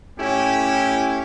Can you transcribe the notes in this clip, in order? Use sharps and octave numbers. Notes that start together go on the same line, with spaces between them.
A2 C#4 E4 G4